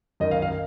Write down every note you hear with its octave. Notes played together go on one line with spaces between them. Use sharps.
F#2 D#3 D#5
F5
F5